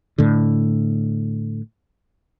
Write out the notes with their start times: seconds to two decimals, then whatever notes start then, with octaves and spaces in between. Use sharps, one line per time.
0.18 A2 D3